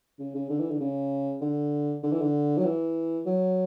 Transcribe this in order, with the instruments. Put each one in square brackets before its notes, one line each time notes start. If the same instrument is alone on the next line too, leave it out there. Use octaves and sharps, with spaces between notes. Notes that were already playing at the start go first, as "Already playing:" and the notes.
[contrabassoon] C#3
C#3
D3
E3
D3
C#3
D3
D3
E3
D3
F#3
E3
F#3